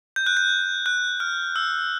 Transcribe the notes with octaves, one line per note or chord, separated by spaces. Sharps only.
G6
F#6
G6
F#6
F6
E6